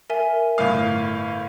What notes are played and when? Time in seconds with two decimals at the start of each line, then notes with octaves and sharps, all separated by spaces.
0.10 A#4 E5 G#5
0.58 G1 A2 F5